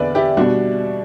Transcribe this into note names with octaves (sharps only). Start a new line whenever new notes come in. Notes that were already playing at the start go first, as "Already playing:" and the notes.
Already playing: E2 D3 B4 D5 E5
E4 G4
B2 G3 D4 F#4